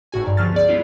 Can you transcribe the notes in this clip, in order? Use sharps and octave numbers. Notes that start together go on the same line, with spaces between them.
G#1 A2 F#4 G#5
G2 D5 A#5
C#2 D3 F3 F#3 F6 A6
B3 G#4 D5
G3 G#3 B3 E4 F4